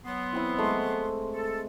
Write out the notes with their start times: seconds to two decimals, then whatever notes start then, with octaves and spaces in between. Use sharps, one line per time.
0.05 F#3 B3 C6
0.33 E3 C4 E4
0.58 G#3 A3 D#5
1.33 A4